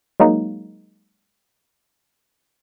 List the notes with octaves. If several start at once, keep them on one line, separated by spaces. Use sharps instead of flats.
F#3 G#3 A#3 D#4